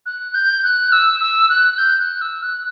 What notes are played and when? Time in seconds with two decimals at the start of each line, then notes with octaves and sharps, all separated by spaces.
0.06 F#6
0.34 G6
0.63 F#6
0.92 E6
1.20 E6
1.49 F#6
1.78 G6
1.99 F#6
2.21 E6
2.43 F#6